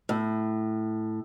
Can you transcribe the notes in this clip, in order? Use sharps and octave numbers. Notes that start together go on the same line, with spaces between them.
A2